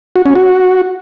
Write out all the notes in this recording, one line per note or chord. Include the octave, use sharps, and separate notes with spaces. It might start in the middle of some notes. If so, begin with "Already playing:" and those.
F#4
C#4
F#4